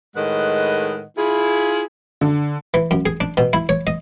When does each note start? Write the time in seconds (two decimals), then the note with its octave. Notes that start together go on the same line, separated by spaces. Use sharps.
0.16 A2 D#3 G#3 B4 D#5 F#5
1.18 E4 F4 G#4
2.21 D3
2.74 E3
2.91 F#2
3.06 G#4
3.21 D4
3.37 B2
3.53 E4
3.69 C#5
3.87 D#5